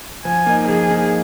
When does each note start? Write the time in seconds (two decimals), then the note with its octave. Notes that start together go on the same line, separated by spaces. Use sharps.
0.25 F3 G#5
0.46 A#3 D#4
0.68 F3 G#4
0.90 A#3 D#4